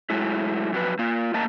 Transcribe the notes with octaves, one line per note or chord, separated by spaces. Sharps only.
F#3 G#3 A3 E4
F2 F#3 B4
A#3 F4
A2 A#3 D#5 A5 A#5